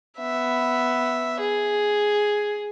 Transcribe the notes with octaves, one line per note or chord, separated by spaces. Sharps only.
B3 E5
G#4